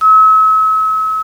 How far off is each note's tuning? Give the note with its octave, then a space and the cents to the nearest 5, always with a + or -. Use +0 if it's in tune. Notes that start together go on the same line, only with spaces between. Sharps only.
E6 -40